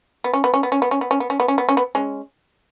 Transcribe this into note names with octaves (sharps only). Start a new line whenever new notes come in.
B3
C#4
B3
C#4
B3
C#4
B3
C#4
B3
C#4
B3
C#4
B3
C#4
B3
C#4
B3
G#3 C#4